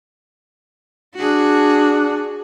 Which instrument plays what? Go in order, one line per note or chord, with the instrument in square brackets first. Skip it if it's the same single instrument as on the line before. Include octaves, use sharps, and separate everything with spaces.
[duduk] D4 [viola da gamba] F#4 G#4